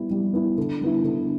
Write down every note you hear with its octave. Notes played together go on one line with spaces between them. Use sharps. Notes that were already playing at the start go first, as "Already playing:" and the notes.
Already playing: G3 B3 E4
G3
B3 E4
D3
G3 B3 E4
D3